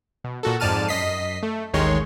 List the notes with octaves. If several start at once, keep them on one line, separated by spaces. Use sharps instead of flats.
B2
A#2 F#4 A4
F2 G#2 D5 A5 F6 D#7
F#2 D#5 B6 C7
A3
A1 D#2 D#3 G#3 C#5 C6